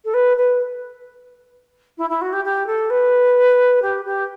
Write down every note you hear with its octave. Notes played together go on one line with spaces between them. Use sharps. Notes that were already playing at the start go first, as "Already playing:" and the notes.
A4
B4
B4
E4
E4
F#4
G4
G4
A4
B4
G4
G4